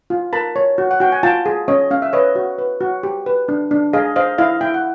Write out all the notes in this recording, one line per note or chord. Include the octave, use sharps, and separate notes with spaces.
F4
A#4 A5 B5
C#5
F#4
F#5
F#4 G5
G#5
F4 G5 A5
G#4
C#4 C#5 D#5
C#4 F5
E5
B4 C#5 D#5
F#4
B4
F#4
G4
B4
D4
D4
G#4 D#5 F5
C5 D#5 F5
E4 D#5 F5
E4 G5
F#5